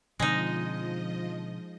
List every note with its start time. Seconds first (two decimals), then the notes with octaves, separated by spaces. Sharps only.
0.19 B2 D3 F3 G#3 C4 D#4 D#5